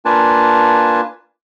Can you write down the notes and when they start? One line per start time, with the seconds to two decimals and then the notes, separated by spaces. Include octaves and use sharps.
0.05 A#3 D4 F4 B4 G#5 A5